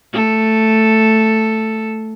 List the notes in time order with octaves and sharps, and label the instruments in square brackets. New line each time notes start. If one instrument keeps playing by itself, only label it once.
[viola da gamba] A3 A4